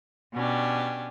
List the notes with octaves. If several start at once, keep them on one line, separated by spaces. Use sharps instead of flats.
B2 C#4 D4 G4